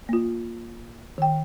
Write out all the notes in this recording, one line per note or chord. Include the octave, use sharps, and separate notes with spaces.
A#3 F4
D#3 G5